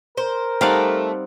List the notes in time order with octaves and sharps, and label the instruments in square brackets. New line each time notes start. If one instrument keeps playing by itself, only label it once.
[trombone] A#4 [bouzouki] C5
[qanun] G3 D#4 D5 [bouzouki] A3 A4 [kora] C4 F5 F#5